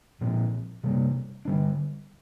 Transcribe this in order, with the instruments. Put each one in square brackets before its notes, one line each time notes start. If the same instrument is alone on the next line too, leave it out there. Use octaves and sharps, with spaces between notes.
[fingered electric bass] A#2 F3 C4
C3 G3 A#3
D3 G3 D4